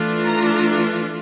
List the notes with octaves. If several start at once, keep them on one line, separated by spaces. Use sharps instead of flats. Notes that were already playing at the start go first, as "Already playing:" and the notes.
Already playing: E3 A3 D4 F4
A#5